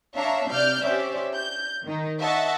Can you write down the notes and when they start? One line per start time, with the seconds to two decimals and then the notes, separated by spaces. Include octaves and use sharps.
0.15 D4 C#5 E5 F5 A5 A#5
0.50 C3 D5 F6 G6
0.82 C#4 G4 C5 D5 E5
1.34 G6
1.85 D#3 D#4
2.21 D#5 E5 F#5 A5 C#6